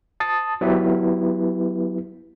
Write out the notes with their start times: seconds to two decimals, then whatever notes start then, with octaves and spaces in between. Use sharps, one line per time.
0.20 A5 D#6 A6
0.61 F#3 B3 E4 G4 B4